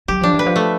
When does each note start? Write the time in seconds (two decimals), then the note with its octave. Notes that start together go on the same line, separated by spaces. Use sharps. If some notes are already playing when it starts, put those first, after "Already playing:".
0.08 F#3 G4
0.21 F3 D4
0.33 E3
0.39 B4
0.46 F3
0.56 A3